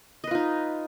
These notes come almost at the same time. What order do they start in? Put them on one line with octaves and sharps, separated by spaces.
D#5 B4 F4 D#4